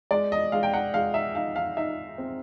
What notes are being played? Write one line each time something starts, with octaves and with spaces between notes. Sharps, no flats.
G#3 D5
D#5
G#3 F5
G5
F#5
G#3 F5
E5
D#4 F5
F5
D#4 E5
C4